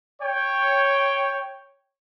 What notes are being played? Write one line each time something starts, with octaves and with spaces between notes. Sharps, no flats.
C#5 G5